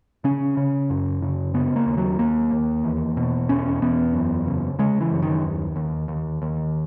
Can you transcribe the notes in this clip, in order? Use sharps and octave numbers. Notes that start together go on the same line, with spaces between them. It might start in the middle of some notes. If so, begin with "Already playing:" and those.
C#3 C#4
C#3
F#2
C#3
C#3 B3
A#3
D#2
F#3
D#2 A#3
D#2
E2
B2
E2 C#4
E2 B3
F#2
C#3
C#3 G#3
E3
F#2
D#3
D#2
D#2
D#2
D#2